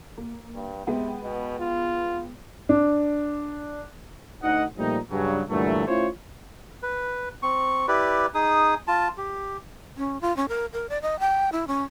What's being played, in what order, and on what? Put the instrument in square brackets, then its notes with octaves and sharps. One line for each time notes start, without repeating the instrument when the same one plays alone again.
[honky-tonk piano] A#3
[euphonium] G2
[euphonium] C3 [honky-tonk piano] G#3 B3 G5
[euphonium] B2
F4
[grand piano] D4
[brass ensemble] D2 D#4 D#5 F#5
A#2 F3 G3 A3 D#4
G2 C#3 F#3
G2 A#2 D3 E3 F#3 A3
A3 C#4 E4 F4 C5 C#5
[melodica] B4
C4 C#6
E4 G4 B4 D5
D#4 G#4 D#6
F4 A5
G4
[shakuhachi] C#4
F4
C#4
A#4
A#4
D5
D#5
G5
E4
C#4